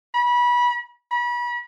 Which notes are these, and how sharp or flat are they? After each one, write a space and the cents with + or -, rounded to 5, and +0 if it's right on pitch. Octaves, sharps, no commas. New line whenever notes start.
B5 -25
B5 -35